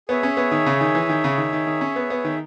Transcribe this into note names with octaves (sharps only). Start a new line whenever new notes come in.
B3 G#4 C#5 E5
C#4
B3
D#3
C#3
D#3
E3
D#3
C#3
D#3
D#3
D#3
C#4
B3
B3
D#3